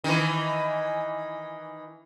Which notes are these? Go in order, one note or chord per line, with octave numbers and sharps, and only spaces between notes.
D#3 E3